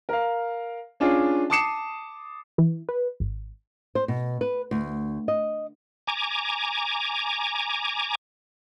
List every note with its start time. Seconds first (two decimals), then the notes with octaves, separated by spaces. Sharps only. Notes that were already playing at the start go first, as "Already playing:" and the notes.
0.09 A#4 F5
1.00 C#4 D4 F4 G#4 D5
1.50 A5 D6 D#6 C7 C#7 E7
2.58 E3
2.89 B4
3.20 G#1
3.95 C5
4.08 B2
4.41 B4
4.71 D2
5.28 D#5
6.07 G#5 A#5 D6